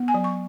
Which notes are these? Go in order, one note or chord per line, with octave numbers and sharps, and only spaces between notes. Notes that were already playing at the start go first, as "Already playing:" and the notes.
Already playing: B3
G#5
F#3
C#6